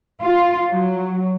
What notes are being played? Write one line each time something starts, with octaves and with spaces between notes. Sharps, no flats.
F4
F#3